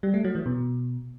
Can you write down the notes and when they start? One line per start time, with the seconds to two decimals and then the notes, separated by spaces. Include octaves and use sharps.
0.03 G3
0.14 A3
0.24 F#3
0.35 E3
0.46 B2